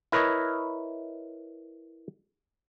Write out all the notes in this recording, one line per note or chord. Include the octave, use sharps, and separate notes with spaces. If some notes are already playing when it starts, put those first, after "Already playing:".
E4 A#4 B4 C#5 D#5